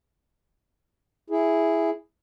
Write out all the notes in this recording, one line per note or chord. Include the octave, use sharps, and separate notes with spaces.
E4 G#4